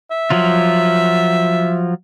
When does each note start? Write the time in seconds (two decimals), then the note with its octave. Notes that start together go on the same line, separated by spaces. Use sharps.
0.11 E5
0.30 F3 F#3 F4